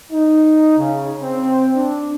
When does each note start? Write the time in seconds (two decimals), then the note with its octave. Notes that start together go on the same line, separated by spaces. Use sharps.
0.11 D#4
0.78 C#3
1.22 C4
1.76 D4